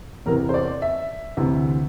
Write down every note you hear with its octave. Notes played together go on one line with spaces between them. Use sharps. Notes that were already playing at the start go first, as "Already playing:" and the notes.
E2 C3 E3 A#4
C5
D5
E5
D2 C3 E3